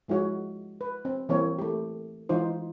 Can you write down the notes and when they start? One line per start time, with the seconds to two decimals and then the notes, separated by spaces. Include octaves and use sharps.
0.08 F3 G#3 E4 F#4 C#5
0.81 B4
1.05 C4
1.29 E3 G3 A#3 C4 A#4 C#5
1.59 A3 G4
2.29 E3 G#3 D#4 F4 C5